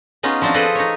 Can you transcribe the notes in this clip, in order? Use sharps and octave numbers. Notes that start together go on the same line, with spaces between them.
B3 C#4 D#4 F4 G#4
F3 C4 D4 F#4
F4 G#4 A4 B4 C5 D#5
D#4 C#5